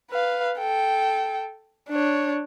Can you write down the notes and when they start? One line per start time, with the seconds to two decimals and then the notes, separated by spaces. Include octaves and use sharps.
0.11 B4 F5
0.58 A4 G5
1.89 D4 C#5